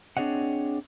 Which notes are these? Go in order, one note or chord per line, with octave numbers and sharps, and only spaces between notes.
C4 D4 G#4 C#5 D#5 F#5